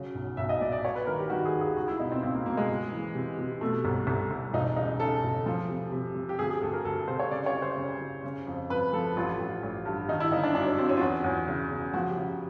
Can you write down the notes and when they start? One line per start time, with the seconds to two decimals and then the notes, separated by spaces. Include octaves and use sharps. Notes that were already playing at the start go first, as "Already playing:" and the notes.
Already playing: C#3 F#3
0.15 B1
0.37 B1 E5
0.49 D#5
0.61 A#2 D5
0.72 D5
0.85 F#3 C#5
0.95 B4
1.07 D#3 A#4
1.19 G4
1.30 D#3 F#4
1.45 G#4
1.53 D#2
1.61 G#4
1.76 C#2 F#4
1.88 E4
1.99 B2 D#4
2.12 C4
2.23 C#2 C4
2.34 A#3
2.46 B2 A#3
2.57 G#3
2.69 C#2
2.92 E3
3.15 C3
3.39 C3
3.61 B2 A3
3.85 C2
4.07 C2
4.31 C2
4.53 E1 D#4
4.76 C#3 D#4
5.00 C#3 A4
5.23 E1
5.46 F3
5.69 C3
5.92 C3
6.15 C3
6.29 G4
6.39 D2 G#4
6.50 G#4
6.61 D2 A4
6.73 A#4
6.85 D2 A4
7.08 C3 C5
7.19 C#5
7.31 C#3 D5
7.46 C#5
7.55 F#1
7.62 C5
7.77 C#3
8.01 F#1
8.24 C#3
8.47 F2
8.69 F2 B4
8.93 F3 A4
9.17 A1 F4
9.39 A1
9.63 A1
9.86 G2
10.08 D#3 D#4
10.20 E4
10.31 G1 D#4
10.43 D4
10.54 F#2 D4
10.67 C#4
10.78 F#3 C4
10.89 C#4
10.97 F4
11.01 E2 F#4
11.24 E2
11.47 C#3
11.70 C#3
11.94 F3 F#4
12.09 G4
12.17 C#3